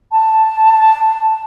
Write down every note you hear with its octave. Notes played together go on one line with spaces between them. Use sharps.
A5